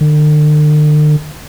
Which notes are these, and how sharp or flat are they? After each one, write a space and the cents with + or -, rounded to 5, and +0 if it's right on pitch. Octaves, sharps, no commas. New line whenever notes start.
D3 +45